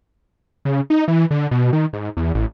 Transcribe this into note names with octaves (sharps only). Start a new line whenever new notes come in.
C#3
D#4
E3
D3
B2
D#3
G#2
E2
A1